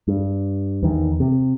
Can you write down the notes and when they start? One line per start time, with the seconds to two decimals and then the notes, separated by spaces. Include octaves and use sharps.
0.08 G2
0.83 E2 D#3
1.20 C3